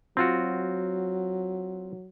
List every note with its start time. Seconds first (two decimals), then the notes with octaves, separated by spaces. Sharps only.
0.17 F#3 C4 F4 F#4